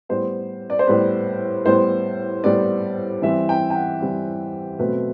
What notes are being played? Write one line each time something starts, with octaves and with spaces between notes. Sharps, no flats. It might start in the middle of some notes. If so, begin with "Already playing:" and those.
A2 G3 B3 C5
D5
C5
A2 G3 B3 B4
A2 G3 B3 C5
A2 G3 B3 D5
E3 G3 C4 E5
G5
G5
F#5
E3 G3 C4
B2 F#3 A3 C4 B4